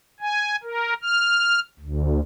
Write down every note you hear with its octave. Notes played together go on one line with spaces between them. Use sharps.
G#5
A#4
F6
D2